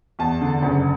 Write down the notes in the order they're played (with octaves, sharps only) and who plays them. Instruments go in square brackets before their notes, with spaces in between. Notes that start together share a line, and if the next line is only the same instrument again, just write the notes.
[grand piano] E2 A5
D3
F#1